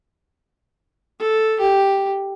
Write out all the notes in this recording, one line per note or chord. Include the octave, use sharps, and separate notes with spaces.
A4
G4